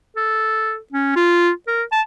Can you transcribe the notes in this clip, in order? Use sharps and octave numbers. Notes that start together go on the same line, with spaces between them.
A4
C#4
F4
A#4
A5